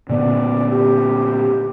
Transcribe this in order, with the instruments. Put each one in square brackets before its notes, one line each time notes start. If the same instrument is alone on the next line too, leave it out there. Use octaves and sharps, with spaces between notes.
[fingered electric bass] A#2 D3 B3 [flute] D5
[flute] G4